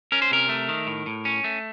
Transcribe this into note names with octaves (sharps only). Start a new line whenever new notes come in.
C#4 A#4
C5
C3 A#4
A3
D#3
A2
A2
C#4
A3